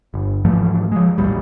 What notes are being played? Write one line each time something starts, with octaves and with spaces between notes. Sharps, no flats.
G1
G#2 E3 F3 A3
F3 G#3
A1 D#2 A#2 G3